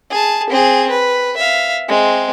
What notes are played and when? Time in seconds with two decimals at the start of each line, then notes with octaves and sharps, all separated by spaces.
0.10 G#4 A5
0.50 C4 G#4
0.90 B4
1.37 E5 F5
1.88 G#3 C4